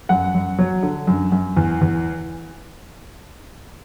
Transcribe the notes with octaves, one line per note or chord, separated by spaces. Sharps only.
F#2 F#5
F#2
F#3
D3
F#2
F#2
E2
E2